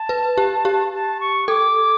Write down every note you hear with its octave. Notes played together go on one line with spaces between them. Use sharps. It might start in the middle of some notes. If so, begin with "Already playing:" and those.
Already playing: A5
B4
G4
G4
A5
C#6
A4 D6